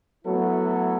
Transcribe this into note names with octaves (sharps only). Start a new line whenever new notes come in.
F#3 A3 B3 E4 A4